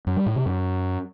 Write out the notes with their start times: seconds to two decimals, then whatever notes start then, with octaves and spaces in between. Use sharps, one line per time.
0.07 F#2
0.16 G3
0.26 A2
0.36 C3
0.46 F#2